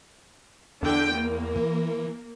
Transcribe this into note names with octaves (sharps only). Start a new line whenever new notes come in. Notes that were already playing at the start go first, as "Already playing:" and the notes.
E2 D3 G5
A#3
E3